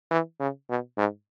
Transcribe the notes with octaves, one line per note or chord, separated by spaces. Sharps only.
E3
C#3
B2
G#2